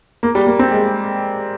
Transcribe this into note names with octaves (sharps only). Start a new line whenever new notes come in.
A#3
G3
A#3
C4
G#3